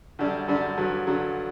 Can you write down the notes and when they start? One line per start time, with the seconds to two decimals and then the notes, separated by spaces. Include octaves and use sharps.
0.19 F#2 D3 G3 D4
0.48 F#2 D3 G3 D4
0.77 G2 D3 F#3
1.07 G2 D3 F#3